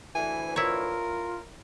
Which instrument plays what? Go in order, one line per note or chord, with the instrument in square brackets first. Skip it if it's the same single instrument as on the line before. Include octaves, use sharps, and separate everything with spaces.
[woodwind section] D2 E3 [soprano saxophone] G#5
[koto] E4 C#5 [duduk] F4 [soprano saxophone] A#4